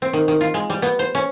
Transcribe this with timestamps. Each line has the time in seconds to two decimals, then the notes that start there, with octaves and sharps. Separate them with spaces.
0.02 C4
0.13 D#3
0.28 D#3
0.41 F4
0.54 G#3
0.70 G3
0.82 B3
0.99 C5
1.15 C#4